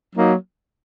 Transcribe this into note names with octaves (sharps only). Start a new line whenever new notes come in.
F#3 A#3 D#4